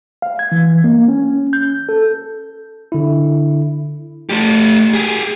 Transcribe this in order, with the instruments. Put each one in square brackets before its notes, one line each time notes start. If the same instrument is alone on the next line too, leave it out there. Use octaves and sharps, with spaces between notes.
[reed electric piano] F5
G#6
E3
A#3
C#4
G6
A4
[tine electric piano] D3 E4
[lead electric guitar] A3 G4
G4 G#4